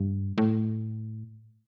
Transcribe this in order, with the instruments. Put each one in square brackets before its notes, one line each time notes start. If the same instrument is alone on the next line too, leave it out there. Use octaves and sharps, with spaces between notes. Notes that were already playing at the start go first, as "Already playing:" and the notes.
Already playing: [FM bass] G2
A2